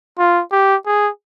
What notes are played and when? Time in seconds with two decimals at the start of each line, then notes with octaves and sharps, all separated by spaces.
0.18 F4
0.52 G4
0.86 G#4